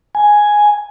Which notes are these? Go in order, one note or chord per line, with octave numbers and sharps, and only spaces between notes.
G#5